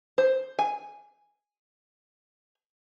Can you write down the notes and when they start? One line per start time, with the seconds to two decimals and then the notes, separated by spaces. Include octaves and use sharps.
0.18 C5
0.59 G#5